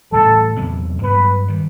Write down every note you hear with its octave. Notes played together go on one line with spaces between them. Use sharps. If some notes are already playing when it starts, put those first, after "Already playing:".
A2 E3 G3 A4
E2 C3 F#3 B3
G2 F#3 B3 B4
D#3 G3